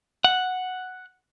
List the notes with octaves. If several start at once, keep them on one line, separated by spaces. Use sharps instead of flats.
F#5